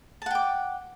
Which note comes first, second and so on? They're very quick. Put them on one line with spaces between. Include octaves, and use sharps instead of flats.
A5 F#5 G5 D6